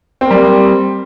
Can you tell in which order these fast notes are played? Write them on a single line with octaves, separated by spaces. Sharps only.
C4 A#3 G3